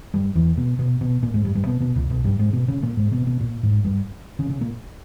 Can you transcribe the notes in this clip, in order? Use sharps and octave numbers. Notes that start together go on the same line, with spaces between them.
G2 G3
E2 E3
B2 B3
B2 B3
B2 B3
A#2 A#3
G#2 G#3
G2 G3
G2 G3
B2 B3
B2 B3
C#2 C#3
B1 B2
G2 G3
G#2 G#3
B2 B3
C#3 C#4
A#2 A#3
G#2 G#3
B2 B3
B2 B3
A#2 A#3
G#2 G#3
G2 G3
C#3 C#4
C#3 C#4
A#2 A#3